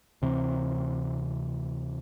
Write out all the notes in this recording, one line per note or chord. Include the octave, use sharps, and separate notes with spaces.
D2 C3 E3 C4